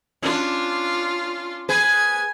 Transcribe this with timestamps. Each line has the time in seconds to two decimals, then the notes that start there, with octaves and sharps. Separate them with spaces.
0.22 C#4 D4 F4
1.69 G#4 B4 G#5